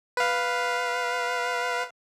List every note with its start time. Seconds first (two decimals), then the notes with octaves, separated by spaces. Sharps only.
0.17 B4 F5